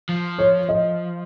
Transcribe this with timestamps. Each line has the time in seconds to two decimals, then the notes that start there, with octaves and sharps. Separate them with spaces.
0.09 F3
0.39 C#5
0.69 D#5